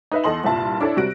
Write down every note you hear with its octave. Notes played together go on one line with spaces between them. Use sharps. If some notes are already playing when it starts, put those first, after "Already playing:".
D#4 B4 E5
E2 A4 D#5 C6 F#7
C2 G2 A#2 E5 A5 C6
D4 E4 A4 C#5 D5
C3 G3 F#4 F#6 A#6 D7